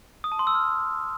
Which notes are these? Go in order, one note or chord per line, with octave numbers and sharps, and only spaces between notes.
D#6
A5
C6
E6
F6